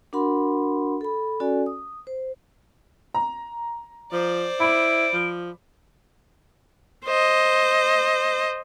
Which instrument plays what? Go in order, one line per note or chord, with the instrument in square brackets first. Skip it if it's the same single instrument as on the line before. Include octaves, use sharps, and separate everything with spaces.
[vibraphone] D4 F#4 A#4 F#5 B5 C6
A4 B5
C#4 F#4 A4 D5 G#5
D#6
C5
[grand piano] A#5
[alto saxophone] F3 [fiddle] C5 D5
[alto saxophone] E4 [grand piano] B5 D6 [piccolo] D7
[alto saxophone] F3
[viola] C5 D#5